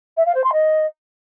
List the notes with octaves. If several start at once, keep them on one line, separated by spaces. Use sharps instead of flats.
E5
F5
C5
C6
D#5